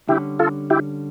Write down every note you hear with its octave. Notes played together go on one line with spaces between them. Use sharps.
D3 G3 C#4 E4 G4
F4 A4
E4 G4